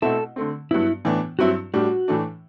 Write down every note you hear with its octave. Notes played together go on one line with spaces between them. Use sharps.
B2 A3 C4 E4 A4
D3 A3 C4
G2 F#3 B3 E4
A2 E3 B3 D4
G2 F#3 C4 E4 F#4
A2 G3 D4 F#4
A2 E3 A3 D4